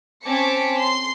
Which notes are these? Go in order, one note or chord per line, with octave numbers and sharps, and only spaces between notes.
C4 C#4 A5 D6 B6 C#7
C6 C7